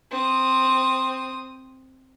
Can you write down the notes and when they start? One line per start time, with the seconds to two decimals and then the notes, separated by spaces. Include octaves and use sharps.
0.11 C4 D#6